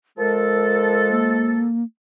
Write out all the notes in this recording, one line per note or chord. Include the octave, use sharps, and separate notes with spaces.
F3 G#3 A4 A#4
A#3